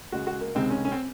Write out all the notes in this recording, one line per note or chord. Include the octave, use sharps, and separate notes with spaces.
C#2 C#3 G#3 F#4
F#4
A#3
C#2 C3 D#3 G#3 C4
C#4
C#4
C4